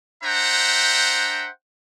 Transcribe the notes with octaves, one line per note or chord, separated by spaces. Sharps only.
D4 C5 E5 F#5 G5 A#5